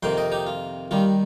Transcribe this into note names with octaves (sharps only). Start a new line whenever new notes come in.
F2 C3 D#3 A#3 G5 C6
D#5 G5
D#4 G4
F4
D#2 D#3 G3 F4